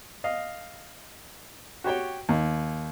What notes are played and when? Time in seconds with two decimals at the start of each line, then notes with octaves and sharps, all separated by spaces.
0.24 D#5 F5
1.84 F#4 G4 C#5 G5
2.29 D#2